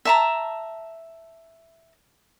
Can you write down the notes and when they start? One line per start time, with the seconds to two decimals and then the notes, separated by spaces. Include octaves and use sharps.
0.05 E5 A5 A#5